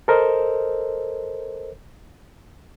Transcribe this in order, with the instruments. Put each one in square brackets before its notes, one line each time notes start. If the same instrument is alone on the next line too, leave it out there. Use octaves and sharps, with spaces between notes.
[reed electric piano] A4 A#4 C5 D#5